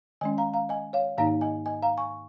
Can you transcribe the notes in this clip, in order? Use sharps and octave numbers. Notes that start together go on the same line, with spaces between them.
D#3 G#3 C#4 D#5 G#5
F5 A#5
F5 A#5
D#5 G#5
C#5 F5
G#2 D#3 A#3 D#4 F5 A#5
D#5 G#5
D#5 G#5
F5 A#5
G#5 C#6